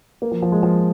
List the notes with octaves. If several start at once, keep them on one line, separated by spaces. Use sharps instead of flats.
A#3
F3
F3
G#3
F3